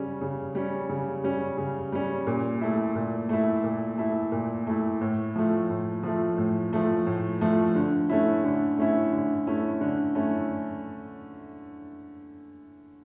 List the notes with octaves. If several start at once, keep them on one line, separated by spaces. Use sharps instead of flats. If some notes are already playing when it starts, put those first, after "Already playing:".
Already playing: C#3 G3 C#4
C#3
G3 C#4
C#3
G3 C#4
C#3
G3 C#4
A#2
A3 E4
A#2
A3 E4
A#2
A3 E4
A#2
A3 E4
A2
F3 A3
A2
F3 A3
A2
F3 A3
A2
F3 A3
D3
A3 C#4 E4
D3
A3 C#4 E4
D3
A3 C#4 E4
D3
A3 C#4 E4